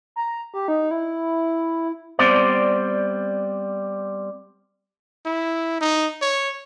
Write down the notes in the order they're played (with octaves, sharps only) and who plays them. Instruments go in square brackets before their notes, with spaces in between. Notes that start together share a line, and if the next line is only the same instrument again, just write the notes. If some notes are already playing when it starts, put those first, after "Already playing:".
[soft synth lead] A#5
G4
D#4
E4
[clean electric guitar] G3 B3 C4 C5 D5
[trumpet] E4
D#4
C#5